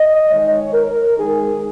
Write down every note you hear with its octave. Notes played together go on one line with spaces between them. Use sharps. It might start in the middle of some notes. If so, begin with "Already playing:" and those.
Already playing: D#5
D#3 G#3 C#5
A#4
D#3 G#3 G#4